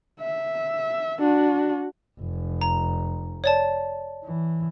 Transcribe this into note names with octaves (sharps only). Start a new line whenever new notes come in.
E5
D4 F#4
F1
A#5
C#5 D5 A5
E3